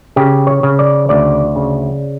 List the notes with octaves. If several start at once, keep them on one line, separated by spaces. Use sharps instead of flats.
C#3 G4
C#5
C#3
D5
D2 D5
C#3